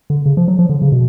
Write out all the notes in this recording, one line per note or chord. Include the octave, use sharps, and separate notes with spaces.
D3
C#3
F3
F#3
F3
D3
C#3
B2